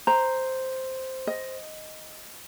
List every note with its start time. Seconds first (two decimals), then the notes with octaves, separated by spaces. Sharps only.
0.07 C5 A#5
1.27 D#5